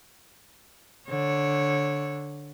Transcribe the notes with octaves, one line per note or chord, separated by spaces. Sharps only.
D3 C#5